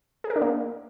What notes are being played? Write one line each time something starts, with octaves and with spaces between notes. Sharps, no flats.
G#4
A#4
D4
A#3